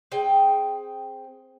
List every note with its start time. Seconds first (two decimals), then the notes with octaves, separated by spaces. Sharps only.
0.12 C4 G#4 G5